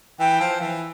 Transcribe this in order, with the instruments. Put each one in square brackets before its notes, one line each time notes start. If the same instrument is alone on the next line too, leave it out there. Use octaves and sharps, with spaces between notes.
[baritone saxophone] E3 [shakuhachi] G5
[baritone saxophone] F3
E3